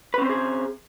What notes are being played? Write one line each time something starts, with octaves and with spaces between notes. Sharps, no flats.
C4 C#4 G#4 B4 C5